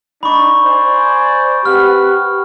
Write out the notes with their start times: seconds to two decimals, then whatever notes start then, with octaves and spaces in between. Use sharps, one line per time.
0.23 D4 D#4 B5 C#6
0.65 C5 D5 G#5
1.66 C4 G4 B4 F#5 F6